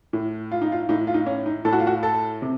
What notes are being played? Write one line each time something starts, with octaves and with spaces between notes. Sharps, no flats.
A2
F4
D#4
F4
A2 D#4
F4
D#4
C#4
D#4
A2 A4
F#4
F4
F#4
A4
C3